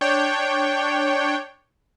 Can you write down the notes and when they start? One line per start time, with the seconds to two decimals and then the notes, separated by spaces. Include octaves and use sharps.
0.01 D4 C#5 G5